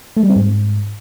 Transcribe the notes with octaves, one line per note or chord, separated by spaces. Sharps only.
A3
G3
C4
G#2